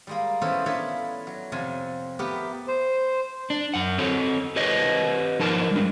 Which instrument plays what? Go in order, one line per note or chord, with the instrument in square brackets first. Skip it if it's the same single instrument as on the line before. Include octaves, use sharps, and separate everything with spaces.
[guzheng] G3 G#3 A#3
E3 B3 C#4 A4 C5
D4 E4 F4 A4 B4 C#5
F#3
F2 C3 G#5 A5
A3 B3 G4 A#4 B4
[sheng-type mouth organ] C5
[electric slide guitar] D4
F#2 F#5
C4 A4 C#5
G4 B4 C#5 D#5
F3 D#4 A#4 A5
G3 G#3 D4